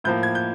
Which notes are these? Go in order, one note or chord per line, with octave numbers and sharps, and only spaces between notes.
A2 F3 A#3 G6
G#6
G6